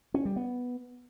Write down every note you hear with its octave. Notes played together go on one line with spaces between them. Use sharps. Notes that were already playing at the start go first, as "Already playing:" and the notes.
C#4
G3
B3